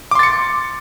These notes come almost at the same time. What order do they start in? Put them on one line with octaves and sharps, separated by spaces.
D6 C6 A6 C#7